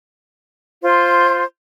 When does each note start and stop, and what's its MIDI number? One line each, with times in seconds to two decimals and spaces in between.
0.83 1.44 65
0.83 1.44 72